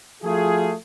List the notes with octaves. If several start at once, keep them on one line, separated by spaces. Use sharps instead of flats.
F3 A3 F4 F#4 G#4